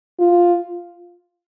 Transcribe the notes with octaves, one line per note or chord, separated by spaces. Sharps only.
F4